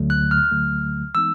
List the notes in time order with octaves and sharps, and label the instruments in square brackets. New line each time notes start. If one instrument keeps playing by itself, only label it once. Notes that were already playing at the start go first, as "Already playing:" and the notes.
Already playing: [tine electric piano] D2 D3 F#3 A3
[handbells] F#6
F6
[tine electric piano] D2 D3 F#3 A3
[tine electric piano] E3 G#3 B3 D#4 [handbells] E6